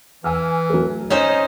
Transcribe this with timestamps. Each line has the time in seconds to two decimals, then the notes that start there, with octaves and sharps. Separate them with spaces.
0.24 E3 G#5 E6 F6
0.70 F#3 A3
1.10 C#4 D#4 C5 C#5 D#6